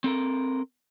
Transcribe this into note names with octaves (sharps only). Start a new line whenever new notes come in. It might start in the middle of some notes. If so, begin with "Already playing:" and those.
C4 A4 A#4